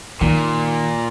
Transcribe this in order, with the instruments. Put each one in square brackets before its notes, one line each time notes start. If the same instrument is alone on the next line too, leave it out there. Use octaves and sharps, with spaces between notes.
[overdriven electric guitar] A#2 [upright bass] D#3